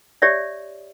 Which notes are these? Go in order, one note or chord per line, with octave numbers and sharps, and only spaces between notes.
G4 C#5 D5 E5